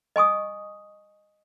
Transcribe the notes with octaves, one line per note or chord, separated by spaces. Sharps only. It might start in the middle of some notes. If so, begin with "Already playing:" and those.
D#5 G#5 C#6 D#6